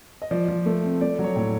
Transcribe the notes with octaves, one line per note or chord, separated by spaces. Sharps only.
D#5
F3 D5
F3
A3
C4
A3 D5
F#3
C#5
A2